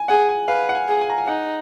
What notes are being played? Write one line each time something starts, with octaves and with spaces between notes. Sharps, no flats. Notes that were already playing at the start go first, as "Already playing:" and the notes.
Already playing: G#5
G#4 F#5
G#5
B4 F5
F#5
G#5
G#4
G#5
A#5
G#5
D#4 F#5